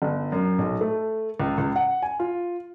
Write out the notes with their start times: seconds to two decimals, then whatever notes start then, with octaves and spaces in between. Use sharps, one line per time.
0.02 G1
0.32 F#2
0.59 B1
0.81 A3
1.40 C#2
1.58 C#2
1.76 F#5
2.02 G#5
2.20 F4